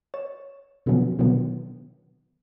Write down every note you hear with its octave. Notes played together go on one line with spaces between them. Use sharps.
C#5 A6 E7
B2 D3 F3 F#3 B3 C#4
B2 D3 D#3 F#3 B3